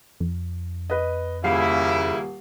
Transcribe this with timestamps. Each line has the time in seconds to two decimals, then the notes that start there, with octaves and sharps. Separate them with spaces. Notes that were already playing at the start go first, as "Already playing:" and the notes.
0.20 F2
0.90 B4 D#5
1.44 D#1 C#3 A#3 E4 F5 C7